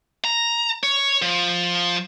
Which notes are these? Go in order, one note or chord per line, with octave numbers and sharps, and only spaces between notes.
A#5
C#5
F3